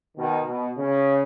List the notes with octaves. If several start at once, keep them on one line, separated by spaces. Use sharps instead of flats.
B2 D#3
B2
C#3